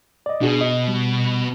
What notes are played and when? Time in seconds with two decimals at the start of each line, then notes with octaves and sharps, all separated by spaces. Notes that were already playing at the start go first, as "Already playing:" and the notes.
0.26 D5 D#5
0.41 B2 D4 F#4 G#4
0.61 D#5
0.88 G3